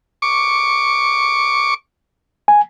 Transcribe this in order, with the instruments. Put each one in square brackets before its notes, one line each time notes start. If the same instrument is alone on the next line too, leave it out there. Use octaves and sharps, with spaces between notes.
[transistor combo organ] C#6 D6
[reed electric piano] G#5